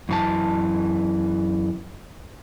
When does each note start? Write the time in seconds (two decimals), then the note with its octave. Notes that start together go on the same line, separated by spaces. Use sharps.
0.09 F#2 E3 A5